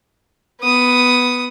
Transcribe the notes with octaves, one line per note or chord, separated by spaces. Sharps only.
B3 D#6